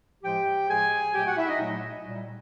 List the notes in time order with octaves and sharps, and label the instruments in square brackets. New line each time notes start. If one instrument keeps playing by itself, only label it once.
[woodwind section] A2 F3 G#3 G4 G5
A2 F3 G#3 G#4 G#5
A#2 F#3 A3 G4 G5
F#4 F#5
E4 E5
D#4 D#5
A#2 F#3 A3
A#2 G3